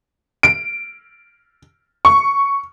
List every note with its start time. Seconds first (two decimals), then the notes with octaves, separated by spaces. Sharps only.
0.43 D7
2.05 C#6